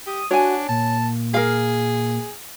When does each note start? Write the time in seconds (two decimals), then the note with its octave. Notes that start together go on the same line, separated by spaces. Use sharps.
0.07 G4 D#6
0.31 D4 F#4 C#5 G#5
0.69 A#2 A5
1.34 G#4 A#4 F5